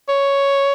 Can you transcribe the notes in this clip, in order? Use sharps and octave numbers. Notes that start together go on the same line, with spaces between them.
C#5